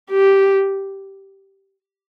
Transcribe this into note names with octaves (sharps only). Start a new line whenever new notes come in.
G4